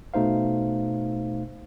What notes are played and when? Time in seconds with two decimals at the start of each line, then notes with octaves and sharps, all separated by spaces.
0.14 B2 A3 D#4 C5 F5